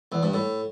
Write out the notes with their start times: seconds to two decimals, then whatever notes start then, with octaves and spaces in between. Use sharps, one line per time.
0.12 E2
0.23 G2
0.34 A2